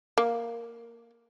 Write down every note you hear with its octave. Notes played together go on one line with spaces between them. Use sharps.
A#3